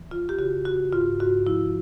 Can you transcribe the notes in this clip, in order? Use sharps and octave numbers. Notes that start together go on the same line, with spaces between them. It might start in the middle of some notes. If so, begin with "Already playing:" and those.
Already playing: E3
F2 F4
G4
C#3 F#4
C#3 F#4
G#2 F4
G#2 F#4
F3 E4